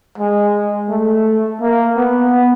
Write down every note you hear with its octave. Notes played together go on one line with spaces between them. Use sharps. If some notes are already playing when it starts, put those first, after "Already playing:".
G#3
A3
A#3
B3